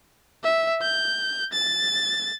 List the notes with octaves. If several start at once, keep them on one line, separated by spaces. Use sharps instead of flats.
E5
G6
A6